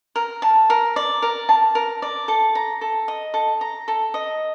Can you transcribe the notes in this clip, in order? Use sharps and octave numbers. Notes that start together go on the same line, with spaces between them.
A#4
A5
A#4
D5
A#4
A5
A#4
D5
A4
A#5
A4
D#5
A4
A#5
A4
D#5